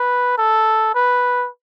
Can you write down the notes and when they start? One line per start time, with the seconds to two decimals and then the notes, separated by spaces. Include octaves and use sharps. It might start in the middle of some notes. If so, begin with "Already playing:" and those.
Already playing: B4
0.38 A4
0.95 B4